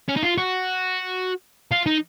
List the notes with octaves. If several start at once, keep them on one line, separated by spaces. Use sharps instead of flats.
C#4
D#4
F4
F#4
F4
D#4